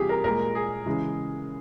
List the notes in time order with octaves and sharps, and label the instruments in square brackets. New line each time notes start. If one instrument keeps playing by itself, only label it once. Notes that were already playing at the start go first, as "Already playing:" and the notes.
Already playing: [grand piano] C3 E3 G3 F4 G4 G#4
A#4
A#2 G#3 A#4
G#4
C#3 E3 G#3